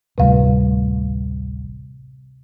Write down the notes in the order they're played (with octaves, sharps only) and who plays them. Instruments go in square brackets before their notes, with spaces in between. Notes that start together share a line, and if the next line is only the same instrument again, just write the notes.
[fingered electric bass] A1 D2 G3 [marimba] C3 F5